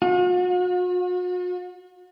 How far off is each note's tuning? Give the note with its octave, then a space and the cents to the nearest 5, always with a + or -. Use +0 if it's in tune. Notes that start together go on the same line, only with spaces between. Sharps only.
F#4 -45